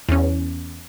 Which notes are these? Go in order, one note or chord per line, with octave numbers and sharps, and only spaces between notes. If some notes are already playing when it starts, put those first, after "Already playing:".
E2 C#4